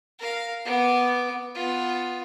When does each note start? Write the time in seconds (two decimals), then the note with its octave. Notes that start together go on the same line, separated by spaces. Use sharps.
0.19 A#4 F5
0.65 B3 D6
1.55 B3 F4